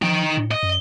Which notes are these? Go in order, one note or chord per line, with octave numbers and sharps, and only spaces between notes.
F3 D#4 G5
A2
D#5
F#2